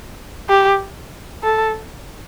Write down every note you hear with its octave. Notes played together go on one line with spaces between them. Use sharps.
G4
A4